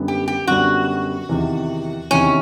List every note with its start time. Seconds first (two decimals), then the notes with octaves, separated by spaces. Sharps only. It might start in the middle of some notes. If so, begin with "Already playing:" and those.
Already playing: F#2 D3 G3 B3 D4
0.08 G4
0.28 G4
0.47 F#2 D3 G3 B3 D4 F#4
1.29 E2 C3 D#3
2.11 E2 C3 D#3 C#4